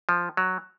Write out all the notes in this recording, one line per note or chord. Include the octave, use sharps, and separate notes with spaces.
F3
F#3